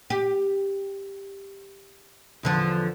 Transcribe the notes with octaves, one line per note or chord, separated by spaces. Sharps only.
G4
E2 D3 F3